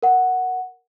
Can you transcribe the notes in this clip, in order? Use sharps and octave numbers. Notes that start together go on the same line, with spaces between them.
A#4 F#5